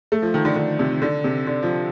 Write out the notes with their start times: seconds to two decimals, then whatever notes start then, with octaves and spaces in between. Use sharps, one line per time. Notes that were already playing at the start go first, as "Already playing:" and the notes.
0.12 A3
0.22 F3
0.34 D#3
0.45 D3
0.56 D3
0.79 C3
1.02 D3
1.24 C3
1.47 D3
1.63 F3